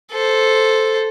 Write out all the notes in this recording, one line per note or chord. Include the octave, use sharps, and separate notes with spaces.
A4 C5